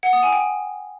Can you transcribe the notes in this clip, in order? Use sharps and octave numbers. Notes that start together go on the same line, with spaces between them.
F#5
D#6
G#5
G5